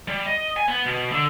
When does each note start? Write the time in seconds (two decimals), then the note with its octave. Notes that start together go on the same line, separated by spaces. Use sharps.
0.08 G3
0.26 D#5
0.57 G#5
0.68 B3
0.86 B2
1.12 D3